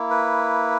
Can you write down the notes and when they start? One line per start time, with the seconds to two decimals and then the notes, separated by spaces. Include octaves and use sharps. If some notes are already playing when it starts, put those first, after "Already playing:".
Already playing: A#3 E4
0.10 B4